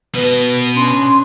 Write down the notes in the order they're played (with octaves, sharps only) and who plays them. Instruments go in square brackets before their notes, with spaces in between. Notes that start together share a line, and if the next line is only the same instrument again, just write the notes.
[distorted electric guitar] B2 [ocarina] B4
[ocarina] C#4 [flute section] D4 C6